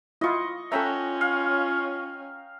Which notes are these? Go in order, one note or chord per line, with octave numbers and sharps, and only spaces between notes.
E4 F4 D#5 C#6
C#4 F4 A4 C#5 E5 F#5 G5 A#5
F5